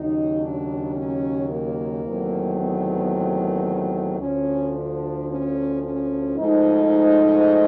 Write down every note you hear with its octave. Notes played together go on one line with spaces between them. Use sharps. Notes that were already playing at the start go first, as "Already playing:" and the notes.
Already playing: D#2 C#3 F#3 D#4
D4
C#4
A#3
E2 C3 D#3 F#3 A3
B3
A#3
D2 D3 F3 C#4
D4
C#4
C#4
G#2 F3 A3 D#4